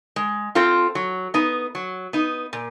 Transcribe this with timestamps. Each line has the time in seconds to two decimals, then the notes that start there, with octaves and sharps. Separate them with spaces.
0.16 G#3
0.55 C4 F4 A4
0.95 F#3
1.34 B3 D#4
1.75 F#3
2.13 B3 D#4
2.53 A#2